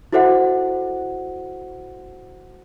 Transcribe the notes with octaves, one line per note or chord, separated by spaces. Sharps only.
E4 F#4 A4 C5 E5 F#5